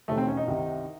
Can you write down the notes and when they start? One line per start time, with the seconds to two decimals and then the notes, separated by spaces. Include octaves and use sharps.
0.08 E1 D#2 D#3 A3
0.18 C4
0.27 C#4
0.37 D#4
0.47 C2 C3 D#3